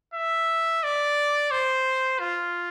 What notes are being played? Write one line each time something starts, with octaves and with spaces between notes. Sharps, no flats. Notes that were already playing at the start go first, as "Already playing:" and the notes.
E5
D5
C5
F4